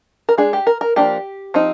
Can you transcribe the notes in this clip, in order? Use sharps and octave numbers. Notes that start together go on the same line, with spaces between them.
A#4
G#3 D4 G#4
G4
A#4
A#4
F3 A#3 D4 G4
F3 C4 D#4